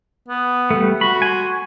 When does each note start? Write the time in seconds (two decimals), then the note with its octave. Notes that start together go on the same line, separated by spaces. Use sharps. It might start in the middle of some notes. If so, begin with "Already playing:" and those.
0.29 B3
0.71 G3 A3
1.01 F#4 B5
1.22 G#5 C6